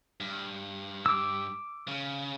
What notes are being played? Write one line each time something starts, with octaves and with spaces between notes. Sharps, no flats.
G2
D6 E6
C#3